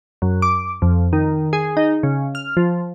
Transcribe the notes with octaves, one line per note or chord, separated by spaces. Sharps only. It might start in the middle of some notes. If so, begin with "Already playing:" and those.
F#2
D6
F2
D#3
G#4
D#4
C#3
F6
F3